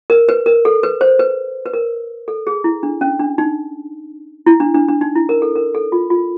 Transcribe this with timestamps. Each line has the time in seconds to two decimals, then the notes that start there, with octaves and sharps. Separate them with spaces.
0.10 A#4
0.29 B4
0.46 A#4
0.65 A4
0.83 B4
1.01 C5
1.19 B4
1.66 B4
1.73 A#4
2.28 A4
2.47 G#4
2.64 E4
2.83 D4
3.01 C#4
3.19 D4
3.38 D#4
4.46 E4
4.60 D4
4.75 D4
4.88 D4
5.01 D#4
5.15 E4
5.29 A#4
5.42 A4
5.55 A#4
5.75 A4
5.92 F4
6.10 F4